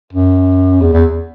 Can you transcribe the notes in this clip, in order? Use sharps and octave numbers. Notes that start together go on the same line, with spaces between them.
F#2
E2
E2